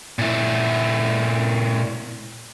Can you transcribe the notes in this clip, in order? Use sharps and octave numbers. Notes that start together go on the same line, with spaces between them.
A#2 E4